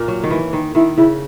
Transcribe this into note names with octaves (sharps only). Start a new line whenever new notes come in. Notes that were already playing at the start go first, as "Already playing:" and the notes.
Already playing: A#2 A#3
F#3
D#3
E3
D#3
D#3 E4
C#3 E4